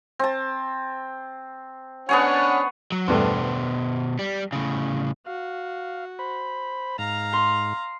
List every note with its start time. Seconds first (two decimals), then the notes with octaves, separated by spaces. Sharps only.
0.19 C4 A5
2.09 B3 C#4 D4 G#4 C#5 F#5
2.92 F#3
3.08 E2 G2 B2 A3 C5
4.19 G3
4.52 A2 C#3
5.26 F#4 F5
6.19 C5 B5
6.98 G#2 F5 A#5
7.33 C6